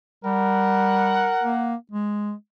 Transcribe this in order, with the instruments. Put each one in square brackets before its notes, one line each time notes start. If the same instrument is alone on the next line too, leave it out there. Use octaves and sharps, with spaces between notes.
[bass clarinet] G3 [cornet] A#4 [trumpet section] F#5
[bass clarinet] A#3
G#3